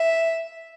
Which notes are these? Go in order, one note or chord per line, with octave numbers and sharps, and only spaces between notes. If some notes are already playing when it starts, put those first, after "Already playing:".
Already playing: E5